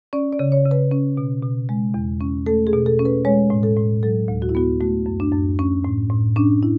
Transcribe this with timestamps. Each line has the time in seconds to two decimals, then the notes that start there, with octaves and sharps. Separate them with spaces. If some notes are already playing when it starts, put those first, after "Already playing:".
0.13 C#4 D5
0.33 D5
0.39 C#3
0.52 C#5
0.65 C#3
0.71 B4
0.91 C#4
1.17 B2
1.43 B2
1.69 G#3
1.94 E2
2.21 C#4
2.46 A3 A4
2.67 G#4
2.73 B2
2.86 A4
2.99 C#4
3.05 B4
3.25 G#3 C#5
3.50 A2
3.63 A4
3.76 A2
4.03 F#3 A4
4.28 D2
4.42 F#4
4.49 E4
4.55 B3 F#4
4.81 A3 F#4
5.06 F#2
5.20 D4
5.32 F#2
5.59 C#4
5.84 A2
6.10 A2
6.36 C#4 D4
6.63 E4